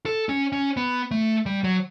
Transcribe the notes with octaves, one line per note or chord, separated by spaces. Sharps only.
A4
C#4
C#4
B3
A3
G3
F#3